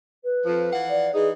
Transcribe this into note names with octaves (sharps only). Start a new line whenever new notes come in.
B4
F2 F3
E3 F5 F#5
D5
E3 D#4 G#4